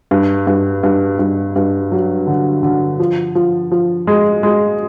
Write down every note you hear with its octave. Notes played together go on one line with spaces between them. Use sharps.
G2
G2
G2
G2
G2
F#3
D3
D3
F3
F3
F3
G#3
G#3